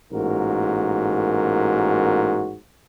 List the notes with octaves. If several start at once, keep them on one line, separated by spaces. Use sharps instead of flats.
A1 G#2 A#3 F#4 A#4